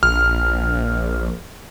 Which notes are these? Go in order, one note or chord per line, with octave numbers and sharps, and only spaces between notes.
A#1 F6